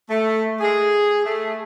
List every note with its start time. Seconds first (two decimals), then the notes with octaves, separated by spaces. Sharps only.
0.11 A3
0.61 G#4
1.26 A3